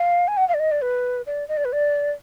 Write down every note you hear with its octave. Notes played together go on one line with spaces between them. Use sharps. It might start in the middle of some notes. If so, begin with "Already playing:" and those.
Already playing: F5
G#5
F#5
F5
D5
D#5
D5
B4
D5
D#5
D5
B4
D5